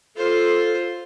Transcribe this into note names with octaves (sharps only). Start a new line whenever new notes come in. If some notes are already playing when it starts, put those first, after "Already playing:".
F4 A4 C5